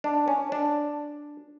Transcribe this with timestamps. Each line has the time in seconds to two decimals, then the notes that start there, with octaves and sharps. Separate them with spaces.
0.04 D4
0.28 C#4
0.52 D4